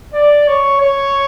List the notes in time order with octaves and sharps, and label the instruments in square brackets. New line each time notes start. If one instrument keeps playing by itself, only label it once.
[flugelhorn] D5
C#5
C#5